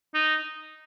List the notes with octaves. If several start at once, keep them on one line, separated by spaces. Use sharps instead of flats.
D#4